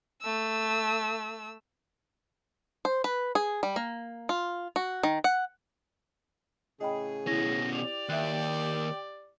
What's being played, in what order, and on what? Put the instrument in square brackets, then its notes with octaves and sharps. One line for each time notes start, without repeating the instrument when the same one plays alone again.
[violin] A3 E6
[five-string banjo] C5
B4
G#4
G3
A#3
F4
F#4
D#3
F#5
[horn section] A2 C#3 G#4 [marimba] D#5 G5 B5
[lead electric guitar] B2 C#4 [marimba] E4 [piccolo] A#6
[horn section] G4 D5 [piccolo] F7
[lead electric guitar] D#2 [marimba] E5 F#6 [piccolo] G5